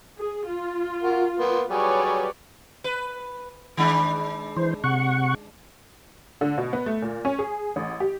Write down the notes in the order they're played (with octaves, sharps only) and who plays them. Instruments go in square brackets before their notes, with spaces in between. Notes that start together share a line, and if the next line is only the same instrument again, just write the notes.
[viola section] G#4
F4
[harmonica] F#4 A#4
A#3 B3 C6
[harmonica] F#3 G3 G#4 [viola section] B4 C#5 D5
[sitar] B4
D#3 G#3 D4
[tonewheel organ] E3 C5
C3 F#5 C#6
[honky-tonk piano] D3
B2
B3
A3
A#2
C#4
G#4
A1
G4